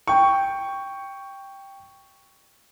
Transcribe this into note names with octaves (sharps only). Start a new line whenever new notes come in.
G5 C#6